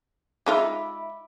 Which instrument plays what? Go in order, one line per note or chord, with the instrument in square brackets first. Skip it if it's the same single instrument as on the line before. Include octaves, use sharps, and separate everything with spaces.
[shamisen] G#3 D#4 F4 [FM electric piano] E5 B5 D6